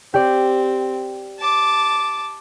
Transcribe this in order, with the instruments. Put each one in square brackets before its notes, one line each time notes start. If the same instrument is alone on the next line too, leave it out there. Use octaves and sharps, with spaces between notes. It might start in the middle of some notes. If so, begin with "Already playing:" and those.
[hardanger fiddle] C4 [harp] G4 D5
[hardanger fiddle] A5 D6